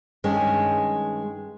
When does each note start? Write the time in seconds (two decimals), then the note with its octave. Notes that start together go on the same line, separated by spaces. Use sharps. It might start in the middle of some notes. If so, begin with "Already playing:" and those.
0.24 G2 D#3 G#3 C#4